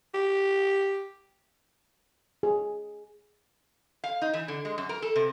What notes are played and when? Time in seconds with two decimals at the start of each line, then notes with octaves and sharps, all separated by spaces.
0.14 G4
2.43 G#4
4.04 F5
4.22 D#4
4.34 E3
4.48 D3
4.65 G#3
4.78 F#2
4.89 A#4
5.02 A4
5.16 C3